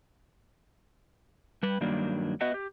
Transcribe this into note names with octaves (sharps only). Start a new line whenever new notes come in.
G3 B4
G2 D#3 F#3 G3 A#3 D4
B3 F#4 B4 D#5 E5 F#5
G4